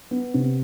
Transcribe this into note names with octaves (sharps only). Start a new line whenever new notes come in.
B3
C3